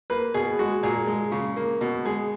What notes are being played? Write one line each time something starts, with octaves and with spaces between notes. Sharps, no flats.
A#3 B4
B2 G#4
G#3 F#4
A#2 G#4
G#3
C#3
A#3
B2
G#3 G#4